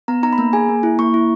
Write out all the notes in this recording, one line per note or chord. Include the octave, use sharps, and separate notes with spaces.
B3 A#5
D#4 A#5
B5
A#3 A#5
G#4 G#5
A#3
E4
A#3 C#6
E4